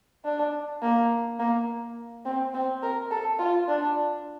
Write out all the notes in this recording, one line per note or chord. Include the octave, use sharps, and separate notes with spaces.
D4
A#3
A#3
C4
C4
A#4
A4
F4
D4